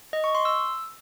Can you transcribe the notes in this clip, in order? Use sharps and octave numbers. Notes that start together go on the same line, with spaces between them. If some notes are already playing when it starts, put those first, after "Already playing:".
D#5
C#6
C6
E6